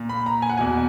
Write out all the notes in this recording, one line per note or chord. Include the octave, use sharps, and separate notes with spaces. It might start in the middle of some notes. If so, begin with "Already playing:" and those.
Already playing: A#2
B5
A#5
G#5
F#5
E2 B2 G#5